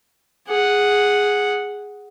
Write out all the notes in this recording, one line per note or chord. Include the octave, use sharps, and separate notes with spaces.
G#4 F#5